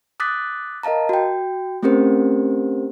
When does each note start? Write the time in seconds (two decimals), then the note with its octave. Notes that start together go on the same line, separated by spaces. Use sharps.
0.20 D6 D#6 F#6 A6 B6
0.83 A#4 D#5 F5 A5 A#5
1.09 F#4 G5
1.83 A3 C4 C#4 G4 A#4 C5